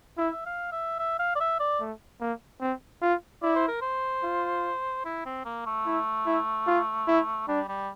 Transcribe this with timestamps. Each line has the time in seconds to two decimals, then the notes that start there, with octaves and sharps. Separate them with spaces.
0.18 E4 E5
0.46 F5
0.72 E5
0.99 E5
1.19 F5
1.35 D5
1.40 E5
1.60 D5
1.80 A3
2.21 A#3
2.61 C4
3.02 F4
3.42 E4 D5
3.55 C5
3.68 A#4
3.81 C5
4.24 F4
5.05 E4
5.25 C4
5.45 A#3
5.66 A3
5.86 E4
6.27 E4
6.67 F4
7.08 E4
7.48 G3 D4
7.68 G3